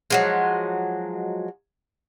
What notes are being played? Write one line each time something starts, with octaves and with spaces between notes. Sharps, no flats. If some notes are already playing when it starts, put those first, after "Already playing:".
F3 F#3 G#3